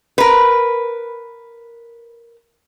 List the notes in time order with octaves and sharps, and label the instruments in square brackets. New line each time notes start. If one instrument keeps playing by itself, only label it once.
[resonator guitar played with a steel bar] A#4 B4